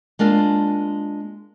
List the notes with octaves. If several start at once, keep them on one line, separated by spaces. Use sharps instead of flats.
G#3 A#3 D4 F4